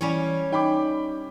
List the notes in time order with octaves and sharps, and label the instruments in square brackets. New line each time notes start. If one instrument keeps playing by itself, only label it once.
[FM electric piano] E3 [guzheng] G3 C#4 C#5
[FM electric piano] D#4 [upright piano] G5 B5 D6